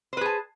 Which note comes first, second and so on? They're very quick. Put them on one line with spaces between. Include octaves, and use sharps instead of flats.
C5 B4 G#4 A5